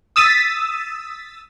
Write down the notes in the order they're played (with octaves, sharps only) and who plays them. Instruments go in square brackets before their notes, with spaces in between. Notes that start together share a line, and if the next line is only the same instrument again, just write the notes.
[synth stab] D#6 E6 A6 B6 D#7